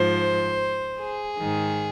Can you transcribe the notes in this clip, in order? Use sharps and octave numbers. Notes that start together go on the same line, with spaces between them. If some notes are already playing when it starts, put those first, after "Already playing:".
Already playing: G#2 F3 C5
G#4
G#2 D#3